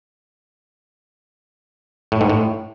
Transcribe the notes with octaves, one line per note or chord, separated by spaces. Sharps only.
A2
G#2
A2